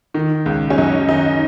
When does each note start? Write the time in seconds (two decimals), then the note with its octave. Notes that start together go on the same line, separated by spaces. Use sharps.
0.14 D#3
0.46 C#2
0.70 C#4
0.78 F#2 D#4
1.09 D#3 D#4